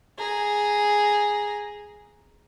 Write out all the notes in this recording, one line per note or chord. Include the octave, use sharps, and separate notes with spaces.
G#4 A#5